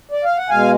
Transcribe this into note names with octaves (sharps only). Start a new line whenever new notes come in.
D5
F5
F#5
B2 G#3 F5 G#5